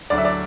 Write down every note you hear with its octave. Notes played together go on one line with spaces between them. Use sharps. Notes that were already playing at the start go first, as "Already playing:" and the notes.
D2 D3 F#3 D5
E5
D5